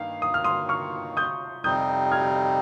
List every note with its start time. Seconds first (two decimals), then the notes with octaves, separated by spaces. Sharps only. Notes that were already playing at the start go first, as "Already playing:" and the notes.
Already playing: G2 D#3 A#3 D#4 F5
0.22 D#6
0.34 F6
0.44 C6 D#6
0.69 C#6 F6
1.17 D#6 G6
1.64 F2 C3 G3 C4 D#4 D#6 G6
2.12 F6 G#6